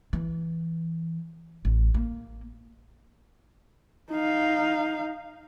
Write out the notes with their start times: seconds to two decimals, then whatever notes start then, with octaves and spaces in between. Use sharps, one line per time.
0.13 E3
1.65 A1
1.94 A#3
4.11 D#4 F5